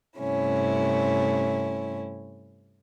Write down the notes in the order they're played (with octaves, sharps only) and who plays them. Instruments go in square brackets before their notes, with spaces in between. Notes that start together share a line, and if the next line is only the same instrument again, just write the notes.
[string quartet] G2 C3 A3 C#4 E4